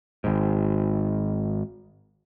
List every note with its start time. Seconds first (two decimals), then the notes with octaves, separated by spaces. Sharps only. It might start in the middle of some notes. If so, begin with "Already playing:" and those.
0.24 G#1 G#2